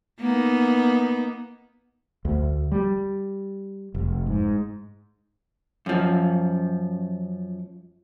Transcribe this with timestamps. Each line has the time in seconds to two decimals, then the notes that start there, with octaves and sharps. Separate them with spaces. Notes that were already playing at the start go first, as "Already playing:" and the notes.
0.20 A#3 B3 D#4
2.25 D2
2.72 G3
3.95 F1
4.26 G#2
5.86 F#2 F3